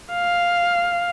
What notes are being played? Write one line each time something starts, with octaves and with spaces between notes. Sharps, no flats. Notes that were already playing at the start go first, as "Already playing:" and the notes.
F5